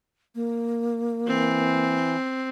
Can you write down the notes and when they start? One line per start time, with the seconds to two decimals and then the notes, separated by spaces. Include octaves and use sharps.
0.35 A#3
1.27 E3 C4